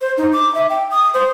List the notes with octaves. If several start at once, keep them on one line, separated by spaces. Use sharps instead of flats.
C5
D#4
D6
E5
G5
D#6
C5